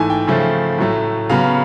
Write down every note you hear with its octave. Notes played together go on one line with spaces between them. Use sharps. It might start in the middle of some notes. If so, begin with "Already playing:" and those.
Already playing: G#2 E3 A3 G#5 A5
G5
C#3 F3 A3
A2 F#3 A3
C#3 F#3 B3 F5